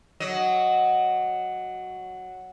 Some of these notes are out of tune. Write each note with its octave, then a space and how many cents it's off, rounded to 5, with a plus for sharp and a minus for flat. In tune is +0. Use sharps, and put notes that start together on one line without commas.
F#3 +0 D#5 +0